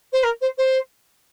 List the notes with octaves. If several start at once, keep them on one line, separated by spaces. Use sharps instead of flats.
C5
A#4
C5
C5